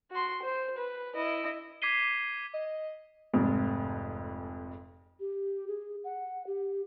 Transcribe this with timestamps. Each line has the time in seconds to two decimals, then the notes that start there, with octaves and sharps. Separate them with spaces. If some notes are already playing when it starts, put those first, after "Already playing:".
0.11 F#4 C6
0.42 C5
0.77 B4
1.15 E4 D#5
1.82 D6 G#6 B6 C7 D#7 G7
2.54 D#5
3.33 F1 F2 G#2
5.20 G4
5.68 G#4
6.04 F#5
6.47 G4